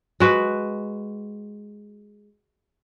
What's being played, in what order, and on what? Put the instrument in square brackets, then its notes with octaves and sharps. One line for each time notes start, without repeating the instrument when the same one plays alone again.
[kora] G#3 F#4 B4